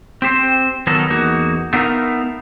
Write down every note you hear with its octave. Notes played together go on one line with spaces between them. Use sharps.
C4 G4 C5
D#3 F#3 B3 A4 A#4
E2 A#3 D#4 F#4
A3 B3 D4 D#4 A#4 F5